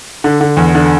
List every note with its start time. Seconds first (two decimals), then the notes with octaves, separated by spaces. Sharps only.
0.24 D3
0.41 D3
0.57 E2
0.75 D3